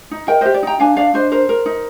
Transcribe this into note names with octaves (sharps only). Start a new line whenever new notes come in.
D#4
A#4 D#5 G5
C5 D#5
G4
D5
D#4 G5 A#5
D4 F5 G#5
D4 D5 F5
D4 C5 D#5
A#4 C5
A#4
D#4